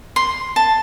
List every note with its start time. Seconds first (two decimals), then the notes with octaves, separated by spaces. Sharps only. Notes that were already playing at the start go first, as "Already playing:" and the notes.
0.16 C6
0.56 A5